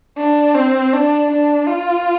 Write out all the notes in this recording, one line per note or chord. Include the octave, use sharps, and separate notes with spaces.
D4
C4
D4
D4
F4